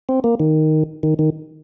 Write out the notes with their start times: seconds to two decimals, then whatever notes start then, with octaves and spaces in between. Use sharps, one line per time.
0.09 C4
0.24 A#3
0.40 D#3
1.03 D#3
1.19 D#3